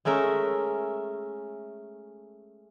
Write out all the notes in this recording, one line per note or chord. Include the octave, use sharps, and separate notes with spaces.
G#3 A3 C#4 A#4 E5